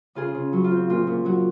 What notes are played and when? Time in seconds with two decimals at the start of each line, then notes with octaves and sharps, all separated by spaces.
0.15 C#3 F4 G#4
0.35 C#3
0.53 F#3
0.64 F4
0.71 C4
0.89 A#2 F4
1.07 A#2
1.25 F#3 F#4